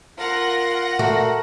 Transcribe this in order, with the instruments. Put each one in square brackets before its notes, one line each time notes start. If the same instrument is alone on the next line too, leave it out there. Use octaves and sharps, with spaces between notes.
[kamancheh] F4 A#4 [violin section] F#5 A#6
[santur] A3 A#4 [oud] F#4